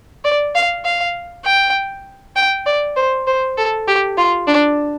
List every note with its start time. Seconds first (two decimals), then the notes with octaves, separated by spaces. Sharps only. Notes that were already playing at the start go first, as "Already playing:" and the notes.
0.24 D5
0.55 F5
0.85 F5
1.45 G5
2.36 G5
2.66 D5
2.96 C5
3.27 C5
3.57 A4
3.87 G4
4.18 F4
4.48 D4